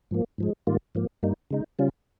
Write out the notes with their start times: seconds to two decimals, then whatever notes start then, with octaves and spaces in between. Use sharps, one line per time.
0.11 G#2 F3 A#3
0.38 G#2 F3 G#3
0.67 G#2 D#3 G3 A#3 F4
0.95 G#2 F3 A#3
1.23 G2 G3 A#3 D#4
1.51 C#3 G#3 D#4
1.79 C#3 G3 C#4 F4